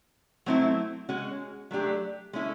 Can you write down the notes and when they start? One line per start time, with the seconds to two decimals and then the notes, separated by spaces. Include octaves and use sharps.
0.46 F#3 A3 C4 E4
1.09 G#3 C#4 F#4
1.71 F#3 A3 D4 G4
2.33 G#3 C#4 E4 A4